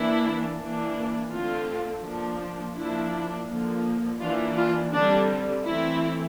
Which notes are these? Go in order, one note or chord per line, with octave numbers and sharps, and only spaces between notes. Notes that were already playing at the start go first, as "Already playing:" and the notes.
Already playing: E3 A#3 D4 E4
E3 A#3 D4
D3 A3 C4 F4
F3 A#3 D4
F3 A#3 D4 E4
D3 F3 A#3
E3 A#3 D4 F4
F4
D3 G3 C4 D4
E3 A3 C4 E4